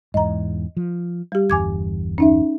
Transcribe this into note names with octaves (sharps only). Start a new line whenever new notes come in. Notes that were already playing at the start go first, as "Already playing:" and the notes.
E2 G#2 D#5 A#5
F3
G3 G4
G1 E2 G2 G#5 D6 G#6
C#4 D#4 E5